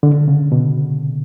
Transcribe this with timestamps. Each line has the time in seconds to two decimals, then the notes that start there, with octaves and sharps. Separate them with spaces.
0.03 D3
0.28 C#3
0.52 B2